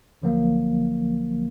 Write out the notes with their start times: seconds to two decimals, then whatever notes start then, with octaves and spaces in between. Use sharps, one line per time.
0.22 C2 D3 F3 F#3 A#3